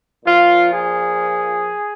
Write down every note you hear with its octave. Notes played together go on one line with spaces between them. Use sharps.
A#2 F3 F4
G#4